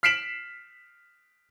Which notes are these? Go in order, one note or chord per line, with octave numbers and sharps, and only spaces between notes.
F6 B6 C7 D7 E7 F#7